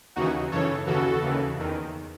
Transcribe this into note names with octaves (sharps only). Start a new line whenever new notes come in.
D#2 C#3 E3 D#4 F#4
F#2 C#3 E3 A4 C#5
D#2 C#3 E3 F#4 A4
D#2 C#3 E3
E2 D#3